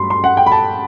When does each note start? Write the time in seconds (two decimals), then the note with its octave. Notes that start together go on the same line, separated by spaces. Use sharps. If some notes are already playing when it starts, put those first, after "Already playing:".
Already playing: G2 F#3 A3 B5 C6
0.10 C6
0.24 F#5
0.37 G5
0.46 B5
0.52 A5